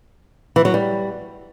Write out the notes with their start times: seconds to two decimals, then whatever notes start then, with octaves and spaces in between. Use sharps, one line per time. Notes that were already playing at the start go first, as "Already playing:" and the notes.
0.56 E3
0.65 F#3
0.74 G3